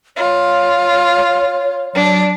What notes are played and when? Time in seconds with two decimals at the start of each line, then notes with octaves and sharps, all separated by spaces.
0.17 F4 C#5
1.95 F#3 D4